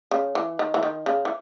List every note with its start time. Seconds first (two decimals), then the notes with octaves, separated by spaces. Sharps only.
0.11 C#3
0.35 E3
0.59 D#3
0.74 E3
0.83 D#3
1.06 C#3
1.25 E3